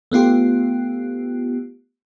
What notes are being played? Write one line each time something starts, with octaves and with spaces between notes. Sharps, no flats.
A3 B3 F4 G4